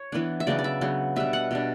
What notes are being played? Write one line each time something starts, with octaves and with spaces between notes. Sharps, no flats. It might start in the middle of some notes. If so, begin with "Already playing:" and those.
Already playing: C#5
E3 B3 D4
E5
C#3 F#3 B3 D4 D5
D5
E5
C#3 F#3 B3 D4
B2 G3 D4 E5
F#5
B2 G3 D4